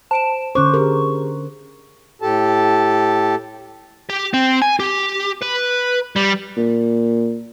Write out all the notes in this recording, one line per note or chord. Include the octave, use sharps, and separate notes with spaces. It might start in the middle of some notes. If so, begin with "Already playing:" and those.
C5 A5 D7 E7
D3 C#4 C5 C#6 D6 F#6
G4 G#4 A#4
A2 G4 A4 A5
G4
C4
G#5
G4
B4
G3
A#2